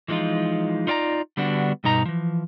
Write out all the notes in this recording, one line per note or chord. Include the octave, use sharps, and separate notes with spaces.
E3 F3 G#3 D#4 F4
D#4 F4 D5 F5 A#5
D3 G3 B3 D4 F#4
G2 B2 D#4 A#5
E3 F3